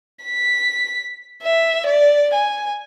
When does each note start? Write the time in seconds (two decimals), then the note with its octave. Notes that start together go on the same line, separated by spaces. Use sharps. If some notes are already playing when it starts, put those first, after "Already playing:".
0.24 B6
1.43 E5
1.86 D5
2.34 G#5